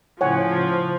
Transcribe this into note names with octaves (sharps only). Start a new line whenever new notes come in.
A2 C#3 F3 E4 C#5 F#5 G#5